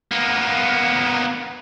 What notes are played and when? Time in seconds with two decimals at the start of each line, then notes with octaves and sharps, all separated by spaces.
0.11 A#3 B3